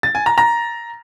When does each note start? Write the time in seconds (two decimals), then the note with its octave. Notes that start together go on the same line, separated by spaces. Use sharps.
0.03 A6
0.15 G#5
0.26 A#5
0.38 A#5